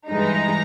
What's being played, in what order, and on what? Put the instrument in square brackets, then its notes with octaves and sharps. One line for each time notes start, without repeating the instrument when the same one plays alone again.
[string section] G2 E3 G#3 D#4 A#5